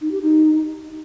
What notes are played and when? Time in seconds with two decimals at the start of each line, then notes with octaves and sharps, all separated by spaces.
0.01 D#4
0.11 G4
0.22 D#4